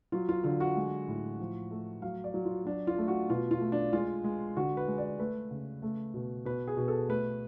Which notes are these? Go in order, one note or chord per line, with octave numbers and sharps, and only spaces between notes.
F#3 F4
F4
D3 F4
F#4
G#3
A2
F3
A3
F#3 F5
D5
F#3
F4
F#3 D4
F4
A3
F#4
B2 F4
F4
A3
D4
G#3 F4
G#3
D3 F#4
B4
G#3
D5
A3 B4
C#3
A3
B2
B2 B4
G#4
B2
A4
A3 B4